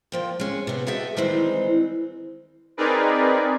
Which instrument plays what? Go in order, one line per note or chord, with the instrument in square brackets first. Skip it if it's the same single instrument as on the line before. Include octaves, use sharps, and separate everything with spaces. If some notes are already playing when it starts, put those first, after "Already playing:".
[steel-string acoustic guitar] A#2 F3 G5
G#3 C#4
C3 B3
F#4 G#4 A4 D#5 E5 G5
D#3 E3 G3 G#3 C4
[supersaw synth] C4 D#4 G#4 A#4 B4 D5